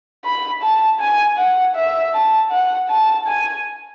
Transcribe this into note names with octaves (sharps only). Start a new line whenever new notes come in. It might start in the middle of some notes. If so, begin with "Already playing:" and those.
B5
A5
G#5
F#5
E5
A5
F#5
A5
G#5